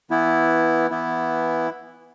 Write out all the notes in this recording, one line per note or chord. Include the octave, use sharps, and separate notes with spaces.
E3 B3 E4
E3 B3 E4